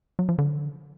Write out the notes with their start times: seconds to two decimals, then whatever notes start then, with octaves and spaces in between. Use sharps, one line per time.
0.19 F#3
0.29 F3
0.38 D3